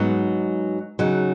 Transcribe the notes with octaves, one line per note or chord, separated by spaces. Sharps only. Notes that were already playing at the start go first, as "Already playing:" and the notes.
Already playing: G#2 F#3 B3 D#4
C#3 F#3 D#4